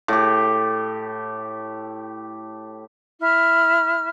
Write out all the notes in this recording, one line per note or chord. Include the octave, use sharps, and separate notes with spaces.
A2 G4
E4 F6